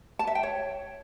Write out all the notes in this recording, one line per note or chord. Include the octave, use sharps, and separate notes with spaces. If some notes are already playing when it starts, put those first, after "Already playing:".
A5
E5
G5
C#5